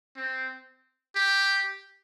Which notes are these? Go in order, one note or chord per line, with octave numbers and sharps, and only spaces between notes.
C4
G4